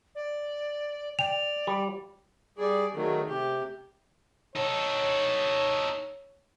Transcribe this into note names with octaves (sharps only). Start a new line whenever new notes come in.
D5
D5 G5 F7
G3
G3 G#4 D5
D#3 F#3 A3 G#4
C3 G4
D#4 A4 C#5